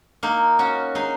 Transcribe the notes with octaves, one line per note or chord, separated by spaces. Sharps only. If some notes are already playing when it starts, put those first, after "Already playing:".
A#3 D#4
C#4 F#4
D#4 G#4